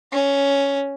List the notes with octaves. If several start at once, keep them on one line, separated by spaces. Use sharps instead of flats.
C#4